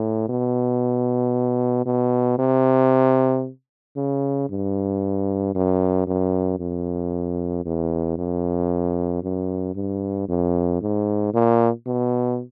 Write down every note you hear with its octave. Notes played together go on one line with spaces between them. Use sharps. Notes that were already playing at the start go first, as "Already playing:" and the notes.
Already playing: A2
B2
B2
C3
C#3
G2
F#2
F#2
F2
E2
F2
F#2
G2
F2
G#2
A#2
B2